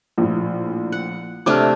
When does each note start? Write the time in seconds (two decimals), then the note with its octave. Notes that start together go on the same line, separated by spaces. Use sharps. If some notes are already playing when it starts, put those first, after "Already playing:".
0.18 A#1 A2
0.92 F#5
1.46 C3 A3 D4 D6 F6